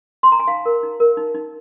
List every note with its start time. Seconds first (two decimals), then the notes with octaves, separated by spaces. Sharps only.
0.23 C6
0.32 A#5
0.40 G#5
0.48 D#4 F5
0.65 A#4
0.83 D#4
1.00 A#4
1.17 D#4
1.35 D#4